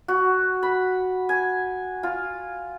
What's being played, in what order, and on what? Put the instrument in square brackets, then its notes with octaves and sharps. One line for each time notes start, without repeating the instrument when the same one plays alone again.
[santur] F#4
B5
G#5
F4